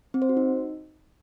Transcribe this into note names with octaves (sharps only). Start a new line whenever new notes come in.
C4
C5
F#4
D#4